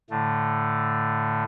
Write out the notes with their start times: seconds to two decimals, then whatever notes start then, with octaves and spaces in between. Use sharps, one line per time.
0.10 A2 D3 A3